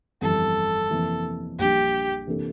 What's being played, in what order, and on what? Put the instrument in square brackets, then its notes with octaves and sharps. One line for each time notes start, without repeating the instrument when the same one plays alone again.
[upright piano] G1 F2 E3 G3 [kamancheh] A4
[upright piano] F2 C3 E3 A#3
[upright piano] A#1 A#2 G3 D4 [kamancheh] G4
[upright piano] C3 E3 A#3 D4 A4